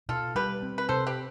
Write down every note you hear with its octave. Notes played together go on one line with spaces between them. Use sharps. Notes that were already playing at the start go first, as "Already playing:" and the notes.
B2 F4 A4
G3 G4 B4
C4
B4
C3 A4 C5
G4 B4